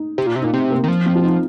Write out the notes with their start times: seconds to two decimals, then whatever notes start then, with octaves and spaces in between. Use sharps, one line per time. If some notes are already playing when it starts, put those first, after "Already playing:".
Already playing: D#4
0.18 C3
0.27 A#2
0.36 C3
0.41 A#2 D#4
0.53 C3 C4
0.70 A#3
0.84 D#3
0.88 F3
1.06 C4
1.15 F4
1.23 D#4